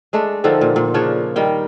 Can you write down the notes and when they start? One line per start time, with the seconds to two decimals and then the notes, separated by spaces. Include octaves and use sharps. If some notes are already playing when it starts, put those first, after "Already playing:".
0.13 G#3 A3 D4
0.44 D3 D#3 F3 A4
0.61 A#2
0.76 A#2
0.94 C#3 F3 D4 C#5
1.36 D#3 G3 G5